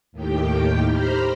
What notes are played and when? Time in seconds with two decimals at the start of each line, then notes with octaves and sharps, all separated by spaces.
0.12 D#2 A2 D#3 G4 G5
0.89 G4 C5 A#5 B5 F6